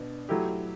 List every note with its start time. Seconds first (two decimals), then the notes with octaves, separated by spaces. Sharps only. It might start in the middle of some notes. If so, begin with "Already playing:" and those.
Already playing: B2 D4
0.29 F#3 A3 E4 G4